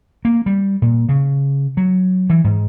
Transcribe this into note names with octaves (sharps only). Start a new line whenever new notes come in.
A#3
G3
A#2
C#3
F#3
E3
G#2